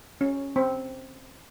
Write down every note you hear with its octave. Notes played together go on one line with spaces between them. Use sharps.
C#4
C4